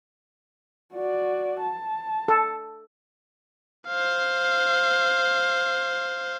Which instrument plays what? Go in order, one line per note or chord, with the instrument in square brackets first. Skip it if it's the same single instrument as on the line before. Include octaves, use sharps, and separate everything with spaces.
[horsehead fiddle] F#4 D5
A5
[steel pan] A4
[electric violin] C5 F5